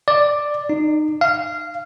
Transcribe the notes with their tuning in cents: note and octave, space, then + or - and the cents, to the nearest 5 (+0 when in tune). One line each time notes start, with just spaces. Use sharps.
D5 +5
D#4 -25
F5 -15